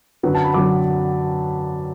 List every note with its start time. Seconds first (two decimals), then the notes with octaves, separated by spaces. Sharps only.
0.23 F#2 D3 F#3 B4
0.35 A5
0.44 B5
0.54 F#2 D3 F#3 D6